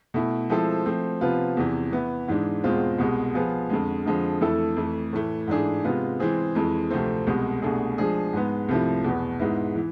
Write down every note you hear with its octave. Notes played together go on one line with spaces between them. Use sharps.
B2 A3 E4
F3 G#3 C4 E4 A4
F3 A3 C4
C3 F3 B3 F4 B4
E2 C3 E3
E3 B3 E4
G#2 E3 G#3 D4
E2 B2 G#3 C4 F4
C2 B2 G#3
F3 B3 F4 G#4
F2 D3 G#3
F2 D3 F3 G#3
F2 E3 A3 E4 A4
F2 E3 A3
A2 E3 A3
G#2 E3 A3 D4 G#4
C3 G#3 B3 F4
E3 G#3 C4 G#4
F2 E3 G#3
D2 C3 F3 A3 C4
C2 B2 G#3
C2 B2 A3 D4 G#4
F3 G#3 D4 G#4
G#2 G#3 B3
C2 C3 F3 A3 E4
E2 B2 B3
G#2 G#3 B3 E4
E3